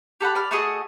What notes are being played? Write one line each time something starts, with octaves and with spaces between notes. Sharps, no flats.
G4 A4 F#5 B5
D5 B5 F6
A3 F#4 G#4 D#5